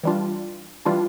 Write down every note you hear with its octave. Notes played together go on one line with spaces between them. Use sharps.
E3 G3 D4 F4
E3 G3 D4 F4